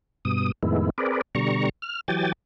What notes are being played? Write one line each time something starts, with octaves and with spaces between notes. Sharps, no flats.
G2 B2 D#6
F2 A2 D#3 G#3 B3 E4
C4 G#4 A#4 B4 D5
B2 D3 G3 A#5 C#6
F6
E3 F#3 G4 G5 G#5 A6